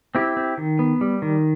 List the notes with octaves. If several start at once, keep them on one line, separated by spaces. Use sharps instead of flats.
C4 E4 G4
C4
D#3
B3
G3
D#3